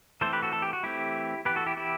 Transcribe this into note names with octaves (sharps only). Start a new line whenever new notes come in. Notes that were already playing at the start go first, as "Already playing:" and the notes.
E3 A3 C4 A4 C5
G4 B4
F#4 A4
A4
G4
F#4
E3 A3 C4 E4 G4
E3 B3 G4 B4
F#4 A4
E4 G4
E4 G4